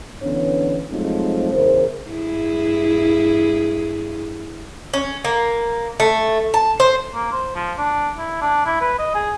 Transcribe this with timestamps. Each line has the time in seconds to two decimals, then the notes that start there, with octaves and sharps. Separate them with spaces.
0.22 D3 E3 B3 C#4 D4 C#5
0.90 F3 F#3 G#3 A3 C4 D#4
1.53 E2 C#3 E4 A#4 C5
2.10 G2 E4 G#4
4.94 C#4
5.25 A#3
6.00 A3
6.54 A5
6.80 C5
7.14 A#3
7.32 C5
7.55 F3
7.78 D4
8.18 E4
8.41 D4
8.66 E4
8.81 B4
8.99 D#5
9.15 G#4